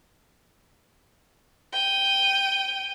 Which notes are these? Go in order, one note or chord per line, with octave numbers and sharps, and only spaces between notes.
G5 D#7